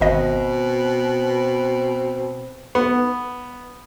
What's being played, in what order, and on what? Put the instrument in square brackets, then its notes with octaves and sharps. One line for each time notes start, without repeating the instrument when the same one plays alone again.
[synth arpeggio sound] G#1 D#5 [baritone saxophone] B2 [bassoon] C4
[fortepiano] B3